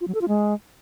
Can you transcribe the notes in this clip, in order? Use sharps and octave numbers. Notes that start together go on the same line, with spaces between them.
F4
F#3
A4
F4
G#3